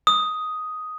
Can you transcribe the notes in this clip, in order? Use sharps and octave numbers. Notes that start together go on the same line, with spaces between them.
D#6